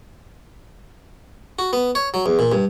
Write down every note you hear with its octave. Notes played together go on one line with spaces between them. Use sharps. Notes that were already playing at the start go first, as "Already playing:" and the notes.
F#4
B3
C#5
F#3
E2
A#2
G2